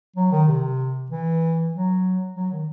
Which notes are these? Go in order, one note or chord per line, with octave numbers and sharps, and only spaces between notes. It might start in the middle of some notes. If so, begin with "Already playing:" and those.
F#3
D#3
C3
E3
F#3
F#3
D#3